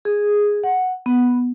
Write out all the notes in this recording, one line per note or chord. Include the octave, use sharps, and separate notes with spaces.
G#4
F#5
B3